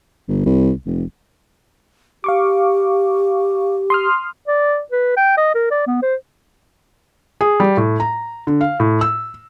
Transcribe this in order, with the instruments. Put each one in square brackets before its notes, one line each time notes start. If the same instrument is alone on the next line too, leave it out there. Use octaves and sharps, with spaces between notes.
[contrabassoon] G1
C2
F1
[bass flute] G4 [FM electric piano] F5 C#6 D6
[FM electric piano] C6 D#6 F6
[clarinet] D5
B4
G5
D#5
A#4
D5
B3
C5
[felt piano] G#4
G3
A2
A#5
D3
F5
A2
E6